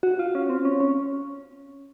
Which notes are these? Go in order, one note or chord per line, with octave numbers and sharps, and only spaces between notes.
F#4
F4
C#4
C4
C#4
C#4